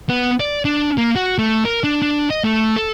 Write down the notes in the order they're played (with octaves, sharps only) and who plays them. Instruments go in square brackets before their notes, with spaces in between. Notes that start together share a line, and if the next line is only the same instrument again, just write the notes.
[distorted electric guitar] B3
D5
D4
A#3
F#4
A3
A#4
D4
D4
D#5
A3
A4